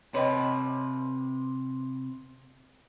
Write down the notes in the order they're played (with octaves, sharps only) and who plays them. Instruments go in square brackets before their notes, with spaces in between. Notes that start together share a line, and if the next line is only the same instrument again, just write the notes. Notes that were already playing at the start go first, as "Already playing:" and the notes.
[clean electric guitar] C3 B4 [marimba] C#5 D#5 G5